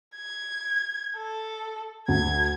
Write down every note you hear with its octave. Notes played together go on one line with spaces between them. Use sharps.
G#6
A4
D2 G#6